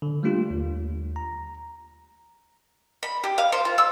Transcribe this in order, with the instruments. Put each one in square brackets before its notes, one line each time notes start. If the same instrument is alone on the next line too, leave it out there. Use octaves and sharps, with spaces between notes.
[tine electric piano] D3
G3 A3 A#3 D4 F4 G4
D#2
A#5
[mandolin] B5
G4
F5
C5
F4
E6